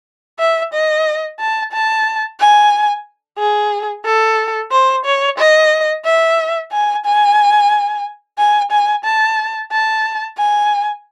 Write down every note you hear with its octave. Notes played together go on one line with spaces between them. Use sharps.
E5
D#5
A5
A5
G#5
G#4
A4
C5
C#5
D#5
E5
G#5
G#5
G#5
G#5
A5
A5
G#5